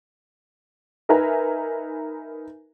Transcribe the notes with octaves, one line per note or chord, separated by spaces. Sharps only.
D#4 A#4 B4 E5 G#5 A#5